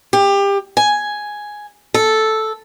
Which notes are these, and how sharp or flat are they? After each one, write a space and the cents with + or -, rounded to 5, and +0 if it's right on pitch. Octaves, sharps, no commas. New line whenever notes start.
G4 +25
G#5 +5
A4 -5